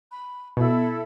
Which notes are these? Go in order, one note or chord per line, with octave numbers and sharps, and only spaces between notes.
B5
B2 E4 A4 B5